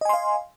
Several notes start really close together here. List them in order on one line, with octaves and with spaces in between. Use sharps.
D#5 G#5 C6 F5